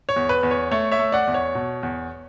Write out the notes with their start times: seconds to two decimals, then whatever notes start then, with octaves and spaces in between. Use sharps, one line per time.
0.09 C#5
0.16 E2
0.29 B4
0.43 E2
0.51 C#5
0.71 A3 C#5
0.91 C#5 E5
0.99 A3
1.12 D5 F#5
1.27 E2
1.34 C#5
1.55 B2
1.83 E2